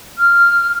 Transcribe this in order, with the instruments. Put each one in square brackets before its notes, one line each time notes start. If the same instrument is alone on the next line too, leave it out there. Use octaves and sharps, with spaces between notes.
[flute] F6